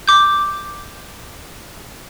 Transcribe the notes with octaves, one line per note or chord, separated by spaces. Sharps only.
D6 G6